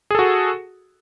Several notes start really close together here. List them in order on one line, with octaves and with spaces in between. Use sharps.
G#4 A4 F#4